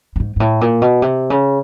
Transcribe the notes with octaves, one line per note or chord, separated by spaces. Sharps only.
G2
G#2
G#2
A2
A#2
B2
C3
C#3